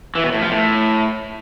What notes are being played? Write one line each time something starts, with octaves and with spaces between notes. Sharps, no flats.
E3
B2
A2
F3
A2